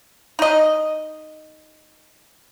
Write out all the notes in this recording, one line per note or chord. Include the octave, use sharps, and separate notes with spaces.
D#4 D#5